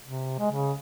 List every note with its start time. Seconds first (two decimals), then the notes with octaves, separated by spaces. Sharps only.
0.04 C3
0.39 G#3
0.51 C#3